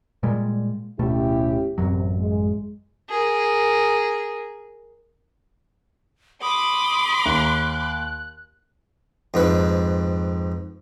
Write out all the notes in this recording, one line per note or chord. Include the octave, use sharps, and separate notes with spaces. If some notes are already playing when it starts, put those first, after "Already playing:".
A#2 G3 G#3
D1 B2 A3 C#4 E4 G4
A1 F#2 C3 F#3
G#3
G#4 A#4
B5 C6 D6 D#6
D#2 F#6
F2 G#2 B4